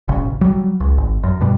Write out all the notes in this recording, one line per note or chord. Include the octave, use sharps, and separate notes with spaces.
E1 A1 C#3
F#3 G3
C#2
G#1
F#2
G2 B2 G3